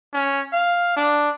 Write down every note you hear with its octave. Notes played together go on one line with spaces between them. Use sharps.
C#4
F5
D4